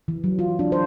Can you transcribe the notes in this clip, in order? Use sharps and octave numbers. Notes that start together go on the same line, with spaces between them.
E3
F#3
F4
D4
C5